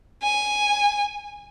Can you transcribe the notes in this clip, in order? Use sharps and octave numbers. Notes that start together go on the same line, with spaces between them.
G#5